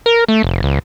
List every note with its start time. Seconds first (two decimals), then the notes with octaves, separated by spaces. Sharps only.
0.06 A#4
0.28 A3
0.43 F1
0.63 C#2